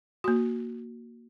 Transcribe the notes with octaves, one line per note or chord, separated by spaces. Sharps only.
A#3 F#4